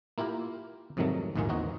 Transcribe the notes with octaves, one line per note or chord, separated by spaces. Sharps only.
A#3 E4 F4 G4 A#4
F2 G#2 C3 D#3 F#3 A3
A#1 D#2 G#2 D#3 F4 G#4
E2 C4 D#4 F#4 D#5